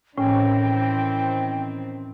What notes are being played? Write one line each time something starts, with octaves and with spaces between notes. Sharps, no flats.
A2 D#3 E3 C4 C#4 G5